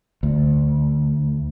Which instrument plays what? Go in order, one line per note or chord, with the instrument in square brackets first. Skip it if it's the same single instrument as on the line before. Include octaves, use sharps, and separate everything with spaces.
[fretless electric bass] D2